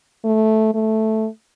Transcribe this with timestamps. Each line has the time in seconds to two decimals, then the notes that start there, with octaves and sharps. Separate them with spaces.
0.24 A3
0.74 A3